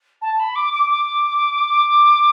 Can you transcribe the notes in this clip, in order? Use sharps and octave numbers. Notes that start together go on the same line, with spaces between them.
A5
B5
D6
D6
D6